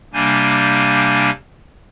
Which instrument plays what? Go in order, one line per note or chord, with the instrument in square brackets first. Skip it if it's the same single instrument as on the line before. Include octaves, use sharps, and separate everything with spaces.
[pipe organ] C3 G3 A#3 D4 G#5 G6